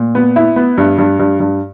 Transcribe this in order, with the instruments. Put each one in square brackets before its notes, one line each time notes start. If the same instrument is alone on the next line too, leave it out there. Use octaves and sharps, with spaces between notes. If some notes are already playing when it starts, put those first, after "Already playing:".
Already playing: [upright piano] A#2
B3
E4
B3
G2
G2
G2
G2